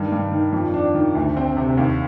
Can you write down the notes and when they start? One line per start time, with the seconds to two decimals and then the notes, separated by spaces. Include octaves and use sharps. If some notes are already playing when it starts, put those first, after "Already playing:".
Already playing: G2 D#3
0.12 G2
0.32 D#3
0.52 F2
0.74 D4
0.95 D#3
1.15 D2
1.37 C4
1.57 C3
1.77 D#2